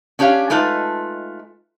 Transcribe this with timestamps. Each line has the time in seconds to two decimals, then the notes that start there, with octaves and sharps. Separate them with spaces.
0.19 C#4 D4 G4 C#5 F5
0.50 G#3 A3 D#4 F4 B4 A5